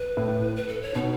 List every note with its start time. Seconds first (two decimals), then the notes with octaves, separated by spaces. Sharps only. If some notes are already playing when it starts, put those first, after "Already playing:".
Already playing: B4
0.17 A2
0.56 B4
0.68 A4
0.82 C#5
0.94 B2 D#4